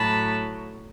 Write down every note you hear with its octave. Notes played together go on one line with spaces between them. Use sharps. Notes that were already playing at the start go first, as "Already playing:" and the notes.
Already playing: A2 F#3 A5 B5